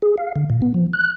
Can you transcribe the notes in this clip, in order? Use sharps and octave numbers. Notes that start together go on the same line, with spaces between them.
G#4
F5
D3
A#2
B3
F3
F#6